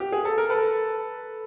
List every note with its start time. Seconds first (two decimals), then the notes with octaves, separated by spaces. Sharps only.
0.00 G4
0.12 G#4
0.25 A4
0.38 A#4
0.50 A4 B4